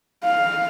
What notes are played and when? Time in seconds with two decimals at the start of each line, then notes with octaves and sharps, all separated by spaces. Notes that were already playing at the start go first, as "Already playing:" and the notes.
0.25 F5